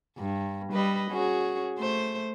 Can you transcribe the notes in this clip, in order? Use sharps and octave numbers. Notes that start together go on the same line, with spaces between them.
G2
G3 B4 D#5
C#4 F#4 G#4
A3 C5